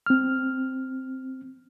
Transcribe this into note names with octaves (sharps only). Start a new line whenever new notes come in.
C4 F6